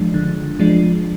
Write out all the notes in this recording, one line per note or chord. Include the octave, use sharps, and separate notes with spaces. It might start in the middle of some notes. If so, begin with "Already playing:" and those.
Already playing: F3 G#3 D4
D3
F3 G#3 D4